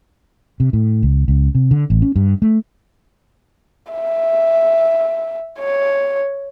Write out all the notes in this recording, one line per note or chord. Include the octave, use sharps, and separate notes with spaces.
C3
A2
C#2
C#2
C3
D3
A1
C#4
G2
A3
E5
C#5